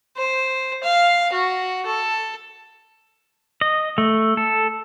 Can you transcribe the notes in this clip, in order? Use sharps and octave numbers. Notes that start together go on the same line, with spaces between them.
C5
F5
F#4
A4
D#5
A3
A4